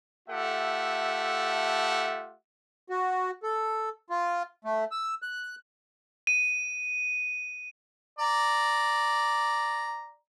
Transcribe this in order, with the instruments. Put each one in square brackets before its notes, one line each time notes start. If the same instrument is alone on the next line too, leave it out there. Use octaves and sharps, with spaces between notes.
[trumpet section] A3 F4 G4 A4 E5 F#5
[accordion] F#4
A4
F4
A3
E6
F#6
[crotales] D#7
[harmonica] D5 A#5